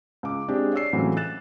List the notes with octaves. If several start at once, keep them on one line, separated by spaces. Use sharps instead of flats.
C#2 D6
G#3 C4 D4 G4 G#4
C#5 D5 E6 C7
C#2 A2 E3 F#3 C4
F#6 A6 E7